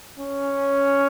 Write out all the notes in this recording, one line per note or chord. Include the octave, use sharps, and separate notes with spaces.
C#4